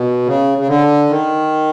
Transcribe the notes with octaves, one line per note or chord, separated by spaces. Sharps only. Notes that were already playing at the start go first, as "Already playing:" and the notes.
Already playing: B2
C#3
C#3
D3
D#3